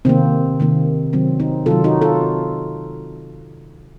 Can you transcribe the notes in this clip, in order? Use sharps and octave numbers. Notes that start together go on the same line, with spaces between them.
C3 D#3 A#3 C4
C3 D#3 A#3
C3 D#3 F#3 C4
C4 D#4
C3 D#3 F#3 F4 A4
D#4 F#4
F4 A4